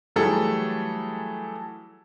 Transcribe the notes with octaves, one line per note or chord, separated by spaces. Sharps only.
E3 F#3 G3 A3 G#4 A4